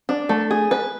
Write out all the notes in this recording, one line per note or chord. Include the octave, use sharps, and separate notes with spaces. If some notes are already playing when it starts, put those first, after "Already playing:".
D4
A3
G#4
B4